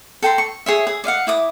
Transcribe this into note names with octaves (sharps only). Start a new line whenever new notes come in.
A4 G5 A#5 C6
C#6
G#4 C#5 E5
G#4 D#6
D5 D#5 F5 F#5
E4 D6 D#6